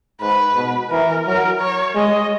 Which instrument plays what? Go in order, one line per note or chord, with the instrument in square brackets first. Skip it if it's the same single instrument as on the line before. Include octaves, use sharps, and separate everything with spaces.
[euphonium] G#2 [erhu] B4
[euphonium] B2
[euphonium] E3 [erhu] A#4
[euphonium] F#3 [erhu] A#4
[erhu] C#5
[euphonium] G#3 [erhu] D#5